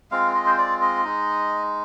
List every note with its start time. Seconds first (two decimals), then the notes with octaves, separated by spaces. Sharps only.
0.11 G#3 C4 F4 F5
0.35 D#5
0.46 C5
0.58 D5
0.81 D#5
1.04 G#3 D#4